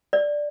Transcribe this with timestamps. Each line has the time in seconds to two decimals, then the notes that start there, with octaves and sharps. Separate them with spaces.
0.13 D5